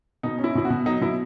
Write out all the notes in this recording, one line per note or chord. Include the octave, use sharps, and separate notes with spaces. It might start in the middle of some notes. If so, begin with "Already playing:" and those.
B2 D#4
C#4
E4
B2 E4
F#4
B2
F#3 D#4
B2 E4